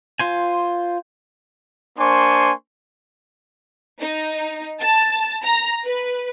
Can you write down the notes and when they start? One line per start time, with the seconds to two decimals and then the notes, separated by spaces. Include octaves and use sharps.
0.19 F4 C5 G#5
1.99 A#3 D4 C5 G#5 C6 C#6
4.00 D#4
4.80 A5
5.44 A#5
5.84 B4